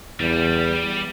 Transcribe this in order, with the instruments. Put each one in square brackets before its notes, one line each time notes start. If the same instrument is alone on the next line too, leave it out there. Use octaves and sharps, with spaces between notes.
[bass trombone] E2 [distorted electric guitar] G3